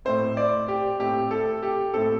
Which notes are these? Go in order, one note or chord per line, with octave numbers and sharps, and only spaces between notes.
A2 A3 C4 C5
D5
G4
A2 A3 C4 G4
A4
G4
A2 A3 C4 A4